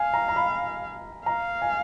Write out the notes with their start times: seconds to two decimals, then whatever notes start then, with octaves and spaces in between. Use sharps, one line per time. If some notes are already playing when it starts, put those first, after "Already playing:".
Already playing: F5 G#5
0.14 A#5
0.28 A#5
0.36 B5
1.26 F5 A#5
1.62 G#5